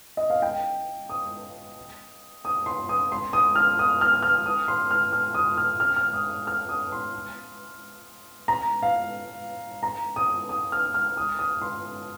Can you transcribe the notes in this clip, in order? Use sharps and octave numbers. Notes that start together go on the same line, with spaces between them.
D#5
F5
G5
D#6
D#6
C6
D#6
C6
D#6
F6
D#6
F6
F6
D#6
C6
F6
F6
D#6
F6
F6
F6
D#6
D#6
F6
D#6
C6
A#5
F5
A#5
D#6
D#6
F6
F6
D#6
D#6
C6